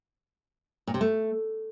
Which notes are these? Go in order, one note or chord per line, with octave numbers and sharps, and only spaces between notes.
A#2
C3
A3